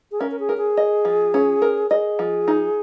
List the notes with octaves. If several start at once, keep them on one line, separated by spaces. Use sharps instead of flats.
G#4
C#4 A#4
A#4
G#4
A#4
G#4
D#5
F3
C#4
A#4
G#4 D#5
F3
D#4